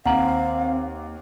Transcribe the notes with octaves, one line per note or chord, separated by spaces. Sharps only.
D#2 C4 F5 F#5 A#5 F#7